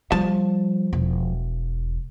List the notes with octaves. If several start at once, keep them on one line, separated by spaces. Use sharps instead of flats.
F3 G3 A5
E1